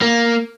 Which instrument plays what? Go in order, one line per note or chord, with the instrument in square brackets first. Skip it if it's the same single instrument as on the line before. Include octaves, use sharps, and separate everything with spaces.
[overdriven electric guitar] A#3